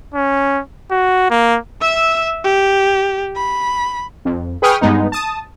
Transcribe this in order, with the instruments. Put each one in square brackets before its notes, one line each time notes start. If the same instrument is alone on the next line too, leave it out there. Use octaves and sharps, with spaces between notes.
[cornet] C#4
F#4
A#3
[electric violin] E5 E6
G4
B5
[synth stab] F2
G#4 B4 G5 C#6 D#6 F6
G2 G#3 B3 D#4
A5 D#6